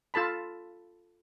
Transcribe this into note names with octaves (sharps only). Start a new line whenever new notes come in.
F4 A4 A5 B5